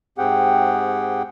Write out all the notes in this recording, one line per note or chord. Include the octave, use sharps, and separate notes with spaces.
G#2 C4 G4 G#4 F#5 G5